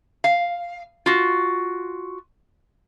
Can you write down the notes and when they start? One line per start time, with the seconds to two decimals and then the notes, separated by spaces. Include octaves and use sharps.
0.24 F5
1.06 F4 F#4